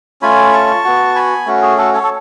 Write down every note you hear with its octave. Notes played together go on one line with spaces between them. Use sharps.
A3 C#4 F4 G#5 B5
A5 C#6
B3 F#4
G#5 B5
A3 C#4 F#4
G#4
F#4 A4
A4 C#5
A4